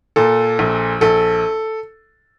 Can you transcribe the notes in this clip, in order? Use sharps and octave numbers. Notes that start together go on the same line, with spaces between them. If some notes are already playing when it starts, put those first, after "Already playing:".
A#2 A4
A#1
A#1 A4